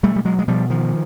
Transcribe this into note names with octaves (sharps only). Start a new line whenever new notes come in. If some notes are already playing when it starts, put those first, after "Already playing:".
B2 G3 A3
G3
F#3 G#3
G#3
B2 F3 G3
D#3 F3